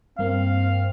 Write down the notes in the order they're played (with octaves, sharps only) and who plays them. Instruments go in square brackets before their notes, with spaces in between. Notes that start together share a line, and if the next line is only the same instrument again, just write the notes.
[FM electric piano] G2 A#3 [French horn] C4 [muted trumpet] F5